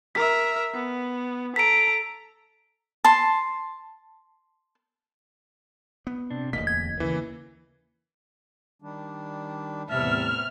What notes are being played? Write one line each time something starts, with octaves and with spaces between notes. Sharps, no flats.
A#4 E5 B6
B3
A4 A#5 B6 D7
A5 C6
B3
C3 D4
D1 A1 E2 A#3 D#5 B6
G#6
D#2 C#3 E3 A#3
D#3 G3 D4
E2 A2 C3 G3 B3 E5 A5 F6